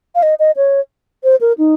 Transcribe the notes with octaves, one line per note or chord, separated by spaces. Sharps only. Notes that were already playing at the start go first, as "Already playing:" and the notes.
F5
D#5
D#5
C#5
C5
A#4
D#4